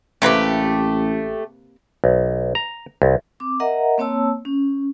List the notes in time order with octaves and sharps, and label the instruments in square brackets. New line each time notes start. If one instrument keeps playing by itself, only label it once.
[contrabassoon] A1 [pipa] C3 A#3 B4 [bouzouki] A3 G4
[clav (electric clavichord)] B1
A#5
C2
[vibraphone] C4 D6
A#4 D#5 E5 F#5 A#5
A#3 C4 C#5 A5 E6
C#4